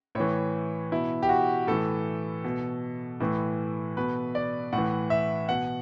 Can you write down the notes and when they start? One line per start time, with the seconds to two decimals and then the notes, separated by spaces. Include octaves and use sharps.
0.15 A2 E3 C#5
0.92 B2 E4
1.23 G4
1.29 F#4
1.67 A2 E3 A4
2.44 B2
3.20 A2 E3
3.97 B2 B4
4.35 D5
4.73 A2 F#5
4.78 E3
5.10 E5
5.49 B2 F#5